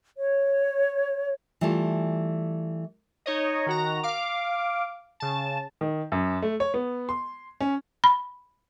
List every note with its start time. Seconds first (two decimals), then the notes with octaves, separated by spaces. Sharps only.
0.18 C#5
1.61 E3 G3 A3 F4 A4
3.26 D#4 C#5 D#5
3.66 D#3 F#4 A#5
4.03 F5 D6
5.20 C#3 A5
5.81 D#3
6.12 F#2
6.42 A3
6.60 C#5
6.74 B3
7.09 C6
7.60 C#4
8.04 B5